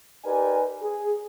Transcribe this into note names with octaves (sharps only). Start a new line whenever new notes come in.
D#4 G4 A#4 B4 D5 G#5
G#4